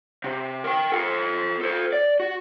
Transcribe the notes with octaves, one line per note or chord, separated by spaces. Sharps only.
C3
A#4 G5
F4 A4
A4 C5
D5
F#4